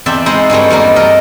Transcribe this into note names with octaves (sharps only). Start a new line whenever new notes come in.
E2 C4 D5 E5 G5
G#3 D#4 E4 C5 F#5
G2 F#3 G3 A3
E2 G3 A#3 D#4
A4 A#4 D#5